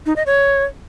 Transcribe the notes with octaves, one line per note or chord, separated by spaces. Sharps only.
D#4
D#5
C#5